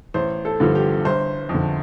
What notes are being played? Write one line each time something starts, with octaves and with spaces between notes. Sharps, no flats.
A1 C5
A4
G2 D3 F3
G4
G1 C5
F2
D3